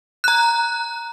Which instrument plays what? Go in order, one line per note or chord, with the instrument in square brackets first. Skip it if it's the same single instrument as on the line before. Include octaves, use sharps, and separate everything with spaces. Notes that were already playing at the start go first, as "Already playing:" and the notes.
[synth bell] A#5 F#6